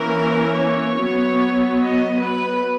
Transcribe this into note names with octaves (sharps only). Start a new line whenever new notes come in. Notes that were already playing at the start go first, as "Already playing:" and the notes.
Already playing: E3 A#3 C#4 A#4
C#5
F#3 B3
D#5
B4